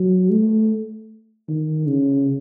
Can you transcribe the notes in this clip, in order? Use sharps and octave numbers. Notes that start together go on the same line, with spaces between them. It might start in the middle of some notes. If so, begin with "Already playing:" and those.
Already playing: F#3
A3
D#3
C#3